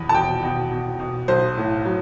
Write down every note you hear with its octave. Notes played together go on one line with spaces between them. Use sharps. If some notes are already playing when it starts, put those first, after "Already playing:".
Already playing: E2 B2 B5
A5
B2 G5
B2
B2
B2
B1 C5
A2
F#3